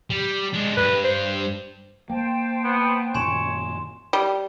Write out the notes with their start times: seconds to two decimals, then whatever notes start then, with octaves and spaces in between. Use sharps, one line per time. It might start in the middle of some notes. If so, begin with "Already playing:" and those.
0.10 G3
0.53 G#3 D4
0.77 G2 B4
1.04 C5
2.10 A#3 C5 G5 A5
2.64 B3
3.15 F#2 A#2 D#3 C#5 G#5 C6 E7
4.13 G3